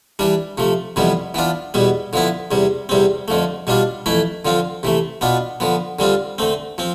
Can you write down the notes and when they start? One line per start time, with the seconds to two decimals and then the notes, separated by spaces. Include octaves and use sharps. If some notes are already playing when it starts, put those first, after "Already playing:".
0.19 E3 G3 D4
0.58 C3 F3 A3
0.96 F2 C3 E3 G3 B3
1.34 E3 B3 D4 F4
1.74 E2 B2 G3 B3
2.13 D3 F3 B3 E4
2.51 E2 C3 G3
2.89 E2 C3 G3 C4
3.28 F2 D3 F3 A3
3.67 B2 G3 D4 F4
4.06 F2 E3 A3 E4
4.45 D3 F3 C4 F4
4.83 C3 E3 A3
5.21 B2 B3 D4 F4
5.60 D3 F3 B3
5.99 D3 G3 C4 F4
6.38 D3 A3 C4
6.78 F3 C4